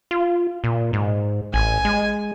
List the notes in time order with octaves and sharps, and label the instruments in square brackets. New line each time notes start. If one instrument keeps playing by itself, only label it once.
[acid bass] F4
A#2
G#2
[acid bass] A1 [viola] G#5
[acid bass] G#3